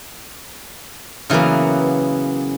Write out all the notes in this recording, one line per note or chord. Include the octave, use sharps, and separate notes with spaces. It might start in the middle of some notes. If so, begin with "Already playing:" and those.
C#3 E3 F#3 A#3 B3